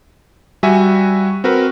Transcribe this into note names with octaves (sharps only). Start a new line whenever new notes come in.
G3 F#4 E5 G#5
C4 F#4 A#4 B4